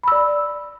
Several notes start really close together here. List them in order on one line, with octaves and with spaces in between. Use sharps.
B5 E6 D5